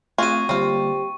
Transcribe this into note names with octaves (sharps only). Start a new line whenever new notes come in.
A3 C4 F4 F#4 G#4 C#6 D#7
D3 G3 A#3 C4 F4 G4